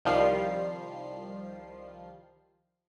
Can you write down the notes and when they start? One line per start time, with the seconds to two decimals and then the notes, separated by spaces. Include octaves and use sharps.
0.05 C2 D#3 F3 G3 F4 C7